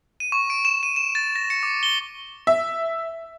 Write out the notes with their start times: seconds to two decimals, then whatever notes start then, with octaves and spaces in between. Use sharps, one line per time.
0.20 D#7
0.32 C#6
0.50 D7
0.65 E7
0.83 D#7
0.96 E7
1.15 A6
1.36 A#6
1.50 C#7
1.63 D6
1.83 G7
2.47 E5